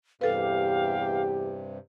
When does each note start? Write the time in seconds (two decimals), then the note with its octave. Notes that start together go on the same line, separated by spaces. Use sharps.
0.21 E2 G2 C3 G4 A4 B4 F5